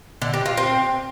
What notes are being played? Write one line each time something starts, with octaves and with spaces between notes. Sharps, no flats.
D3
G4
F4
C4